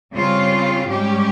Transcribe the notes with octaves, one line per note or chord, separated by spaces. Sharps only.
C#3 G3 C4 F4
G#2 G3 C#4 G4